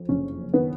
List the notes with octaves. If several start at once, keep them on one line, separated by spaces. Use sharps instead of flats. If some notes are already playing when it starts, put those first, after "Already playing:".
Already playing: F2
F#1 C#4
D#3 B3